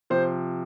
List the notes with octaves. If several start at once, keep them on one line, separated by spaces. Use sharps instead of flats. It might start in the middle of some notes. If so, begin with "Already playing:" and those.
C3 F3 C5